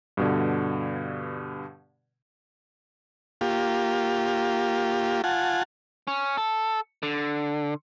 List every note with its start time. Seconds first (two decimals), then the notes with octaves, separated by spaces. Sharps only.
0.17 G2 B2 D3
3.41 A#3 F4 G4
5.24 F4 F#5 G#5 A5
6.07 C#4
6.37 A4
7.03 D3